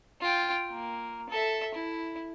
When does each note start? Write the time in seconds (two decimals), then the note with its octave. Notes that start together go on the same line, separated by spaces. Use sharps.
0.21 F4 G5
0.72 A#3
1.29 A4 E5
1.74 E4